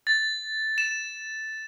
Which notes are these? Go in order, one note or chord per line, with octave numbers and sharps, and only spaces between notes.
A6
E7